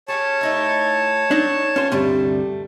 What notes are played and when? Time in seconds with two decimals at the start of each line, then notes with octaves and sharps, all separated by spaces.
0.08 C#4 G4 G#4 C#5 A5
0.41 A3 D#4 E4
1.31 F#3 D4 D#4
1.76 C#4 F4 C5
1.92 D2 G2 C3 G3 A3